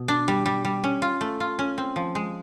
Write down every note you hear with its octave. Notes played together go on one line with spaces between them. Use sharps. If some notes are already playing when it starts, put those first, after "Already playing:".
Already playing: B2
D4
G3
G3
G3
C#4
F4
A3
F4
C#4
C4
F3
G#3